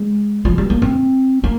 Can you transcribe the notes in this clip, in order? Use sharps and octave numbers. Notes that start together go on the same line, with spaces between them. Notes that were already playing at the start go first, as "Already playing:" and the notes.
Already playing: G#3
F3
G3
A#3
C4
A#3